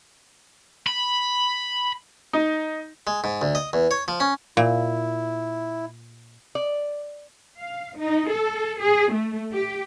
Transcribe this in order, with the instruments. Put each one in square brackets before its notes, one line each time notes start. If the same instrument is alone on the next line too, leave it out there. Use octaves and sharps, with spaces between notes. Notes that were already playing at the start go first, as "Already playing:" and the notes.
[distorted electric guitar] B5
[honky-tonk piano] D#4
[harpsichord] G#3
G#2
D2
D#5
E2
C#5
F3
C#4
[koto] A#2 [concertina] E4
[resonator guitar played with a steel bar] D5
[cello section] F5
D#4
A4
G#4
A3
G4